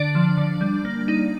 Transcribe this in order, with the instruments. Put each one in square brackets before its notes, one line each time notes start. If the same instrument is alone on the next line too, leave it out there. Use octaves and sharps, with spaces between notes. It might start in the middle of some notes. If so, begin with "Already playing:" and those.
Already playing: [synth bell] D3 D4 D5
F3
D3
G3
A#3
D#4